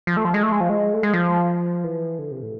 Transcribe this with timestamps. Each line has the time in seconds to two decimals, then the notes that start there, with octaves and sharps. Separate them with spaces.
0.07 F3
0.17 A3
0.25 F3
0.34 G#3
0.43 A3
0.52 G#3
0.60 F3
0.69 G#3
0.93 A3
1.03 G#3
1.14 F3
1.84 E3
2.19 D3
2.31 C3
2.43 A2